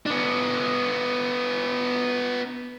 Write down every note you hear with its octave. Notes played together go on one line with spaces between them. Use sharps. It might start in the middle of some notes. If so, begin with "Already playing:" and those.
B3 D4